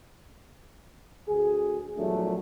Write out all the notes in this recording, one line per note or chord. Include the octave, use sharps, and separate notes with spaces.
D2 G#4
A#1 E2 F#3 G3 A3 D4